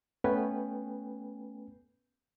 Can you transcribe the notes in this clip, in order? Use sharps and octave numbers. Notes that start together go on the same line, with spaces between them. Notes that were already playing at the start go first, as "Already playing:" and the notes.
A3 B3 C#4 B4 G5 G#5